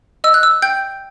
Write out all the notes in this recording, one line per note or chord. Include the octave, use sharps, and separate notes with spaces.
D#5 E6
F#6
E6
G5 G6